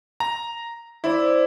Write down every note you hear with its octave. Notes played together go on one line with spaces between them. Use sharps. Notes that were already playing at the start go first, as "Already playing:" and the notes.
A#5
E4 C5 D5 E5